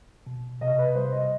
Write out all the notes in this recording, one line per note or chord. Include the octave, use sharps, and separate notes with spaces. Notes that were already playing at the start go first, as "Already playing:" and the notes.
B2
C3 D#5
B4
G3 C5
D#5